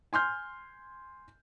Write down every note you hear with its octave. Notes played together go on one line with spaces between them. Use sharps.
G#5 C6 F6 G6